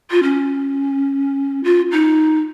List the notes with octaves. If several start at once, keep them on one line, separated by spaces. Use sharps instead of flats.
F4
C#4
F4
D#4